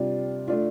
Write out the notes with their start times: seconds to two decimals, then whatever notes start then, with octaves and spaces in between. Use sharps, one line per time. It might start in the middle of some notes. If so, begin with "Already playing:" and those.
Already playing: C3 G3 D4 F4
0.48 A3 D4 F4